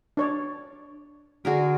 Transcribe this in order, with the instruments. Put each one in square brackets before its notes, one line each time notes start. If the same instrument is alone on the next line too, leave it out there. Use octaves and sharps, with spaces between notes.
[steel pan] D4 C#5 D5
[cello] D3 [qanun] F#4 G#4 A#4